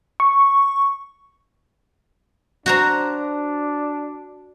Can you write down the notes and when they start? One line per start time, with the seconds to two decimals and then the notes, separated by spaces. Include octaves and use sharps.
0.20 C#6
2.66 D4 F#4 C5 A#5